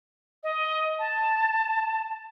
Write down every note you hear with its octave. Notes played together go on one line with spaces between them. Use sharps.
D#5
A5